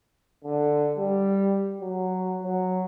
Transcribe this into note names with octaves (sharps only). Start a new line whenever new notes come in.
D3
G3
F#3
F#3